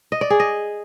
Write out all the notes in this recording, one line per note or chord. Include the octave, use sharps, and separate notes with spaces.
D#5
D5
G#4
D#5